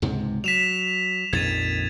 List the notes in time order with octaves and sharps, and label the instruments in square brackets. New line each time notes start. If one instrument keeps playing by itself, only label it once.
[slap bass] C#2 G#2 C3
[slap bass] F#3 [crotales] B6 E7 F7
[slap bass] A#1 F2 D#3 [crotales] G#6 A6 D#7